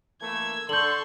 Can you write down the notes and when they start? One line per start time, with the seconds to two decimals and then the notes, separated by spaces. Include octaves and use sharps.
0.22 E3 A3 A#3 E6 G#6
0.69 D3 A4 C6 C#6 G6 F#7